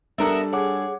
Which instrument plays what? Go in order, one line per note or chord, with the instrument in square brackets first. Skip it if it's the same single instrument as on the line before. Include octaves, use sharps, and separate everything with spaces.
[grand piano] G3 D4 A4 [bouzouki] B3 A#4 E5
[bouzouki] G#4 [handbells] C#5 F#5 D6